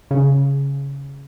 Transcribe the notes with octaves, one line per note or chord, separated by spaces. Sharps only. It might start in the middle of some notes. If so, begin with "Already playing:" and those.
C#3